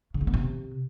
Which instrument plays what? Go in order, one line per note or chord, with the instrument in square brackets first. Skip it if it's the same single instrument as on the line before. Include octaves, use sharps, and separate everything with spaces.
[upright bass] C#3
A#3
B3
C3